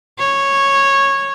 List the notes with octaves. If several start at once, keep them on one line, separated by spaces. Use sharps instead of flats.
C#5